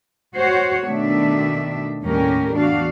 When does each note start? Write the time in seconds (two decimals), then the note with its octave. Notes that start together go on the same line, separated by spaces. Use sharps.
0.35 F#4 C5 C#5
0.87 B2 D#3 A3 D4 E5
2.04 D#2 A2 G3 C#4 G4 A#4
2.54 E2 D4 F#4 F5